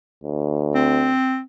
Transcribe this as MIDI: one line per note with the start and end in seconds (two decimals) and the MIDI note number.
0.24 1.14 38
0.75 1.41 60